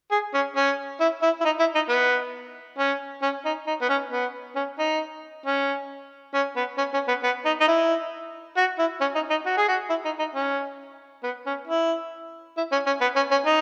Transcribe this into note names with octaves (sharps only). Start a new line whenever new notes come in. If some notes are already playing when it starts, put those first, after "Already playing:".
G#4
C#4
C#4
E4
E4
E4
D#4
E4
D#4
B3
C#4
C#4
D#4
D#4
B3
C#4
B3
C#4
D#4
C#4
C#4
B3
C#4
C#4
B3
B3
D#4
D#4
E4
F#4
E4
C#4
D#4
D#4
F#4
G#4
F#4
E4
D#4
D#4
C#4
B3
C#4
E4
E4
C#4
C#4
B3
C#4
C#4
D#4